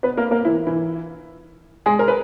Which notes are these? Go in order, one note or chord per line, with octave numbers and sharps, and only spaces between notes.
B3 B4
A#3 A#4
A#3 A#4
E3 E4
E3 E4
G#3 G#4
A#4
B4